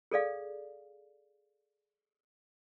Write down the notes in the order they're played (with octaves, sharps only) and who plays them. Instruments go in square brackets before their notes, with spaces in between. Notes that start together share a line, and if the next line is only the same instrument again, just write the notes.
[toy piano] G#4 A4 D5 F5